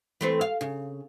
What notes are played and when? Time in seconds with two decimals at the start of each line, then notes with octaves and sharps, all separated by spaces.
0.21 E3 A3 C4
0.41 F5
0.61 C#3